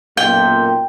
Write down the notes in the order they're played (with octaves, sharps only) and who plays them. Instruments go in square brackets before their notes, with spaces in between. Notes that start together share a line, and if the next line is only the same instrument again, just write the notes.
[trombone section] B1 F#2 A#2 [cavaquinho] G5